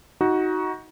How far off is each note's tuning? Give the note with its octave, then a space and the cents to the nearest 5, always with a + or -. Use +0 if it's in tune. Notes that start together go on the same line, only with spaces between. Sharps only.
D#4 +25 F#4 +0